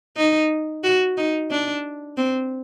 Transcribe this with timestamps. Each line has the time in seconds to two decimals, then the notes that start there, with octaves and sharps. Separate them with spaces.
0.17 D#4
0.84 F#4
1.17 D#4
1.51 D4
2.17 C4